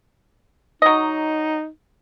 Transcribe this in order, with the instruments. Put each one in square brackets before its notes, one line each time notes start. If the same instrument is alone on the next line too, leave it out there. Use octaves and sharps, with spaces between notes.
[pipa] F#3 D#5 [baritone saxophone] D#4